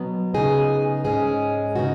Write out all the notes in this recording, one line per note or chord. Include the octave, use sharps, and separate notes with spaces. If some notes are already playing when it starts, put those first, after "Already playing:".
Already playing: B2 F#3 B3
C#3 B3 D#4 G#4
G#2 G#3 C#4 G#4
C#3 B3 D#4 F#4